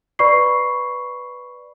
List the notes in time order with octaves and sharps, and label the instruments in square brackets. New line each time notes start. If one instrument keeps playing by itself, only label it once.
[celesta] B4 D5 B5 C#6 C7